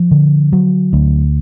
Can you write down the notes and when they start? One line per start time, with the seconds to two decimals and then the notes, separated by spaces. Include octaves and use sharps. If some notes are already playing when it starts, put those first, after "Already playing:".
Already playing: F3
0.11 D3
0.53 F#3
0.93 D2